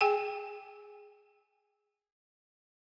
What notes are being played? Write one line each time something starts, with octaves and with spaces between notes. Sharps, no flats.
G#4 G5 G#5